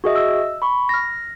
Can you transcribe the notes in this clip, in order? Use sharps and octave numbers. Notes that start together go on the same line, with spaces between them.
F#4 G#4 D#5 E5
E6
B5 C#6
F6 A#6